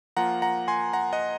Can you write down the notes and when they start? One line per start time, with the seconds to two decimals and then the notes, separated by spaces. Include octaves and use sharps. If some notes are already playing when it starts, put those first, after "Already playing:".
0.17 F3 A#3 F4 F#5 A#5
0.42 F#5 A#5
0.68 G#5 C6
0.93 F#5 A#5
1.13 D#5 F#5